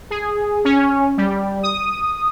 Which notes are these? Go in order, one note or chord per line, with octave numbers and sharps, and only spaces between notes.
G#4
C#4
G3
D#6